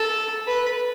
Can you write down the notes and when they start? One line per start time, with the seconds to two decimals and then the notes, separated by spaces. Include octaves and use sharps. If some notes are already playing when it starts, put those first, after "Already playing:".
Already playing: A4
0.47 B4